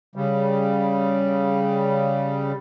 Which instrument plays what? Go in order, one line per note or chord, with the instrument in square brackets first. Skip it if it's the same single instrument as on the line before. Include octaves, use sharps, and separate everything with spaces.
[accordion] C#3 G3